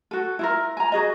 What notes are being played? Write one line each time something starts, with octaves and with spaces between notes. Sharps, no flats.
F#4 A4
E4 F4 A#4
G#5 A#5
F#4 G#4 D#5